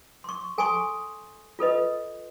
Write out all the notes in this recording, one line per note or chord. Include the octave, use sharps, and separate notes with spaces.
C6 C#6
A4 G#5 A#5 C6 C#6 D#6
F4 A4 B4 D#5